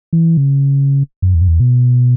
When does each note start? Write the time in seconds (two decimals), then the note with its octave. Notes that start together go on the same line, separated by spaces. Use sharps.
0.13 E3
0.37 C#3
1.22 F#2
1.34 E2
1.41 F#2
1.48 E2
1.60 B2